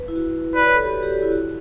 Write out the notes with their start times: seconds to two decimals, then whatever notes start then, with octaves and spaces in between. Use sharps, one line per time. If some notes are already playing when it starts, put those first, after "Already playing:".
Already playing: B4
0.08 E4
0.16 F#4
0.54 B4 D5
0.65 C#5
0.74 A4
0.83 G4
0.94 F#4
1.03 G4
1.13 F#4
1.22 E4
1.32 F#4